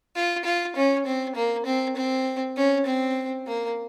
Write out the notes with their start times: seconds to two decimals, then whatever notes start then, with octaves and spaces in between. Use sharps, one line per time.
0.16 F4
0.45 F4
0.76 C#4
1.06 C4
1.35 A#3
1.66 C4
1.96 C4
2.57 C#4
2.86 C4
3.47 A#3